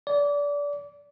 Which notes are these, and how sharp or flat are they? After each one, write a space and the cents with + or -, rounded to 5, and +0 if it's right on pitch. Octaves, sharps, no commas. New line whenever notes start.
D5 -25